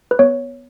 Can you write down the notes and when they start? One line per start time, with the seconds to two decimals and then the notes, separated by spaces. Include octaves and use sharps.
0.11 B4
0.19 B3 C#5